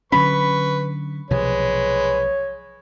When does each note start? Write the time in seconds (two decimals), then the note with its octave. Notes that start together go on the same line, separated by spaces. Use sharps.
0.12 D3 F#3 C#4 B4 B5 C#6
1.31 B1 C3 F3 G#3 B4 C#5